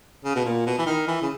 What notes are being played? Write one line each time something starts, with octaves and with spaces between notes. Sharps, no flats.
C#3
B2
A#2
B2
E3
D#3
E3
C#3